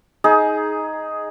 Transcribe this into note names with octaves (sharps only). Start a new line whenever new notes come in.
D#4 G#4